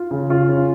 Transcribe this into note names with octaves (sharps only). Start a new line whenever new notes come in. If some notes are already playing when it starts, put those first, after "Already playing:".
Already playing: F4
C#3
F4
C#4